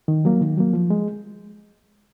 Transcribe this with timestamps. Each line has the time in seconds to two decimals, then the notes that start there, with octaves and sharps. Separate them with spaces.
0.08 D#3
0.25 F#3 A#3
0.41 D#3
0.58 F#3 A#3
0.73 F3
0.90 G#3